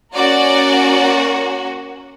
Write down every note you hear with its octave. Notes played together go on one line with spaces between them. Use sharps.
A#3 C#4 F#4 D5